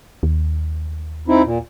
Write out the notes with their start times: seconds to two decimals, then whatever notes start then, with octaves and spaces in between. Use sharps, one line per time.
0.23 D#2
1.28 C4 D#4 E4
1.45 A#2